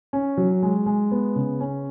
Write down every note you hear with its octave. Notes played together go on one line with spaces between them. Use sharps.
C#4
F#3
G#3
G#3
B3
C#3
C#4